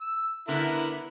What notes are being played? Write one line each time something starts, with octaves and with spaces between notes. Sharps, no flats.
E6
D3 B3 E4 A#4